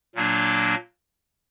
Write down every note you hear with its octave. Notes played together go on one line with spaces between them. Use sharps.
A#2 F#3 A#3 D4